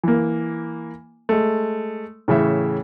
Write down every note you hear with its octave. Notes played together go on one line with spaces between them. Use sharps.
E3 A#3
G#3 A3
A2 C#3 E3 E5